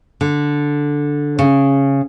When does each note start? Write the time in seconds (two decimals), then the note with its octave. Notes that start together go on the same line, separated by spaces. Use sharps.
0.21 D3
1.39 C#3